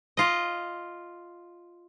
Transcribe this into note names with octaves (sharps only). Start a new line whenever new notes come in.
F4 D#5